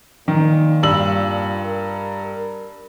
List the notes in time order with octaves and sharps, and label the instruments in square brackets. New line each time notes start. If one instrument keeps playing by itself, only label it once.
[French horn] A#2 [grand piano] D#3
[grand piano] G2 E6 F#7
[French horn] A#4